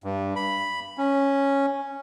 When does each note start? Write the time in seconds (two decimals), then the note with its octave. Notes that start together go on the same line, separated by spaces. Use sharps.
0.04 G2
0.36 B5
0.98 C#4